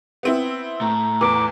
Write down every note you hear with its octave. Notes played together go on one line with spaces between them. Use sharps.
B3 C4 E4
A2 A#5
E2 E3 D6